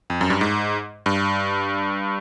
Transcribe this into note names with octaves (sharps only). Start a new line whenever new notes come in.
F2
F#2
G2
G#2
G2